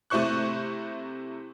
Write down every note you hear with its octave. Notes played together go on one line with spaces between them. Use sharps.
C3 A3 E4 C5 C#6 F#6